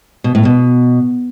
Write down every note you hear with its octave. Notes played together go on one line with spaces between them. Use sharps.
B2
A2
B2